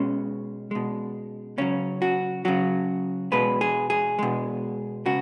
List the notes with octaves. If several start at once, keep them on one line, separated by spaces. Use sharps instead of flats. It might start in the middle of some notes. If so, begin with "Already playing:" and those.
Already playing: B2 G#3 C#4
B2 G#3
C#3 F#3 C#4
F#4
C#3 F#3 F#4
B2 G#3 B4
G#4
G#4
B2 G#3
C#3 F#4